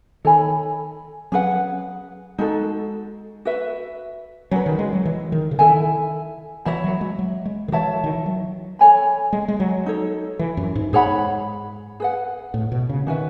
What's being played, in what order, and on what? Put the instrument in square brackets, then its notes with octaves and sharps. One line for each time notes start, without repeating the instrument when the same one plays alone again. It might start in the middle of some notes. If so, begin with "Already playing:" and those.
[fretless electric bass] D#3 [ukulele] A4 C#5 G#5 B5
[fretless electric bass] F#3 [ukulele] C#4 G#4 B4 F#5
[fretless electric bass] G#3 [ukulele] D#4 F#4 A4
[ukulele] F#4 B4 E5
[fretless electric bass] F#3 [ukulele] C#4 F#4 B4
[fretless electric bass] D#3
G#3
F#3
E3
D#3
C#3
[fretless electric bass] D#3 [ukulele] E4 A4 E5 G#5
[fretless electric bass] E3 [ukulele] F#4 C#5 E5 B5
[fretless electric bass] F#3
G#3
F#3
G#3
D#3
[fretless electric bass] E3 [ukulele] F#4 C#5 E5 A5
[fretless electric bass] D#3
E3
F#3
[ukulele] A4 C#5 G#5 B5
[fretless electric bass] G#3
G#3
F#3
[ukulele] D#4 A4 C#5
[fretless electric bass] E3
F#2
G#2
[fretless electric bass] G#2 [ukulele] G#4 C#5 F#5 B5
[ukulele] G#4 B4 F#5
[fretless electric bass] A2
B2
C#3
[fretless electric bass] D#3 [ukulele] C#4 F#4 B4 E5